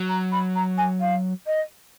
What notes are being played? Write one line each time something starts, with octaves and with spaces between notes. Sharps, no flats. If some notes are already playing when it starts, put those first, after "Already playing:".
Already playing: F#3
A#5
B5
A#5
G#5
F5
D#5